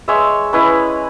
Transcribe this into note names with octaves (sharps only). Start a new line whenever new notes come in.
G#3 C#5 E5
C#4 E4 B4 D#5